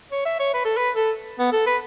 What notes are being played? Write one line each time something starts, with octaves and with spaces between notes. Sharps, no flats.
C#5
E5
C#5
B4
A4
B4
A4
B3
A4
B4